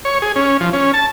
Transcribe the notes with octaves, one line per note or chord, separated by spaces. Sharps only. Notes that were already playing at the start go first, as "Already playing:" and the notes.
C#5
G#4
C#4
F3
C#4
A5